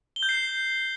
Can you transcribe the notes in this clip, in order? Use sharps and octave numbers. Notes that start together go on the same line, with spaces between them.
G7
G6
C7